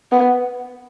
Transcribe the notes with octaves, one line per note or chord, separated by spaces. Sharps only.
B3